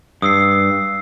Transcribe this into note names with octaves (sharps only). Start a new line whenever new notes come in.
G2 D#6 E6 C7